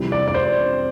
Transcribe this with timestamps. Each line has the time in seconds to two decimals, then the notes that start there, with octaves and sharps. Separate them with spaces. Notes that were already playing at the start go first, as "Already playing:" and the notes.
Already playing: F2 C3 E3 G3
0.12 D5
0.28 D5
0.34 C5